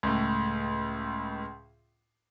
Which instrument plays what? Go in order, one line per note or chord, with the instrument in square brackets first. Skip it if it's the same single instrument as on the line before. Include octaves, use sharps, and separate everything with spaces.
[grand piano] C#2 A2